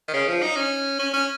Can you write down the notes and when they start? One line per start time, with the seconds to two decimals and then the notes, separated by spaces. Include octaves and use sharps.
0.08 D#3
0.14 C#3
0.28 F3
0.42 D#4
0.56 C#4
0.99 C#4
1.14 C#4